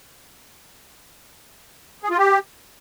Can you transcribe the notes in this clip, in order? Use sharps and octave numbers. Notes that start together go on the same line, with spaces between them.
G#4
F4
G4